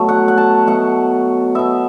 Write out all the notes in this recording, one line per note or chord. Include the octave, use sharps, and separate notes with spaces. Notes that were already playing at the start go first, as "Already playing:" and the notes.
Already playing: B2 F#3 A3
F#5
F#5
A5
B2 F#3 A3 F#5
B2 B3 E5